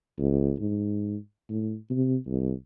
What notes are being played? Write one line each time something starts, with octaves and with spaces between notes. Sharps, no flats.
C#2
G#2
A2
C3
C2